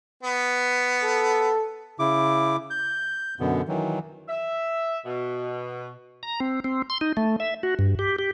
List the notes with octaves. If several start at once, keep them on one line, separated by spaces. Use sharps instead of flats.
B3
A4
C#3 E4 D6
G6
F#2 B2 D3 B3
D#3 E3 F#3
E5
B2
A#5
C4
C4
C6
D#4
A3
E5
F#4
G2
G4
G4